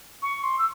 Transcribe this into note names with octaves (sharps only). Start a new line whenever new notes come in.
C#6
C6
E6